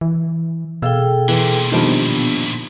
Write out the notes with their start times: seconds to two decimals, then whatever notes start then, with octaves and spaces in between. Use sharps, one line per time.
0.01 E3
0.82 B2 G#4 A4 F5 G5 E6
1.28 A#2 D3 E3
1.72 D#3 F3 G3 B3 D4